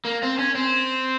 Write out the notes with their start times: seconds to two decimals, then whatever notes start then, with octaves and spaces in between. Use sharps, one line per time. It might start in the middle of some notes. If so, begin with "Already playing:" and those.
0.05 A#3
0.23 C4
0.39 C#4
0.55 C4